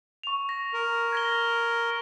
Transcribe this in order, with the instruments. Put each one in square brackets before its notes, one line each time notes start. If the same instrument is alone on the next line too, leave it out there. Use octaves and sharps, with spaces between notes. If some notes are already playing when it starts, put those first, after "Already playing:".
[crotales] C#6 F7
A#6
[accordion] A#4
[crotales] G#6 A#6 G7